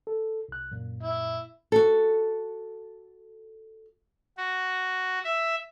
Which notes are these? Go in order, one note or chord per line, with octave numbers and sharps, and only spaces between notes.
A4
C2 F#6
F#2 A#2
E4
F#4 A4
F#4
E5